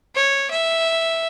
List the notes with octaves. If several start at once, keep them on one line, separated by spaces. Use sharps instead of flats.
C#5
E5